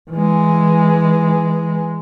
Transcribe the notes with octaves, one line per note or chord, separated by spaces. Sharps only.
E3 G#3